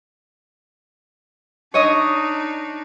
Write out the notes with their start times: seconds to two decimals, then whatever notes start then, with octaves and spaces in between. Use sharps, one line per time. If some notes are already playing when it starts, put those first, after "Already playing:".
1.74 D4 D#4 C#5 D#5 D#6